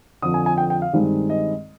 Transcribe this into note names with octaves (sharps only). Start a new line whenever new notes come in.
F2 D3 F3 D#6
G#5
G#5
G5
G5
F5
G2 D#3 G#3 C4 D#4
D#5